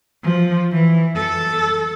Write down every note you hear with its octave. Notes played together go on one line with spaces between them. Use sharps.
F3
E3
A4